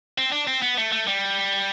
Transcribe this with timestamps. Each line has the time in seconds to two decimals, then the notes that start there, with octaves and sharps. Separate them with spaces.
0.18 C4
0.32 D4
0.48 C4
0.62 B3
0.78 A3
0.92 A3
1.08 G3